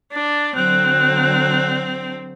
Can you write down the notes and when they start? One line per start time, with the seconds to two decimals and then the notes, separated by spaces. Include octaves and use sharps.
0.12 D4 A6
0.55 D3 F#3 C4 F#6